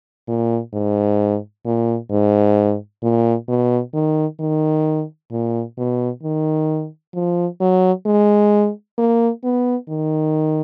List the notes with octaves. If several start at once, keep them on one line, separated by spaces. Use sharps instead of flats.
A#2
G#2
A#2
G#2
A#2
B2
D#3
D#3
A#2
B2
D#3
F3
F#3
G#3
A#3
B3
D#3